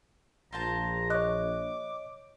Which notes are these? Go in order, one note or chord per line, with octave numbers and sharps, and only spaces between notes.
A#1 F4 C5 A5 A#5
C#5 D#5 D6 F#6